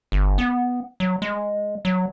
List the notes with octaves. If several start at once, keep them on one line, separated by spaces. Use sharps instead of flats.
G1
B3
F#3
G#3
F#3